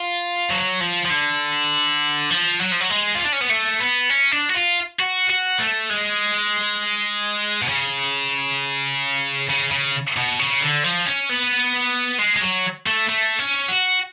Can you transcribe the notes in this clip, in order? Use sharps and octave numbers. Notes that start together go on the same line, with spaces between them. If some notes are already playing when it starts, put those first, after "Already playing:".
Already playing: F4
F#3
F3
F3
D3
F3
F#3
F3
F#3
G#3
F4
D4
C#4
B3
A3
B3
C#4
D4
F#4
F4
F#4
F#4
A3
G#3
B2
C#3
C#3
C#3
B2
C#3
D3
F3
C#4
B3
G#3
G#3
F#3
A3
A3
C#4
F#4